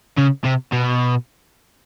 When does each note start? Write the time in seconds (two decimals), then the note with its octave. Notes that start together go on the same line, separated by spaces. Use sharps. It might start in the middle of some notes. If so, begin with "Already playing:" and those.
0.18 C#3
0.45 C3
0.73 B2